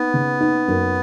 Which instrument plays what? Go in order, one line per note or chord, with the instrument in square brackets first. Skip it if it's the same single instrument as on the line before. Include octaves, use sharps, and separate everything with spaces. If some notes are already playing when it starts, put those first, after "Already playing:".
Already playing: [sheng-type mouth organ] B3 [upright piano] D#4
[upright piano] C#3
D#4
F#2